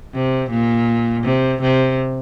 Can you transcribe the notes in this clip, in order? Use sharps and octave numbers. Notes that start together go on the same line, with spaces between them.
C3
A#2
C3
C3